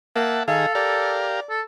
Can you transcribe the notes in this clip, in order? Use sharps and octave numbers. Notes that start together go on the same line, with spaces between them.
A#3 E5 F#5 A5
D#3 G#4 A4 F5
G4 A#4 D5 F5
A4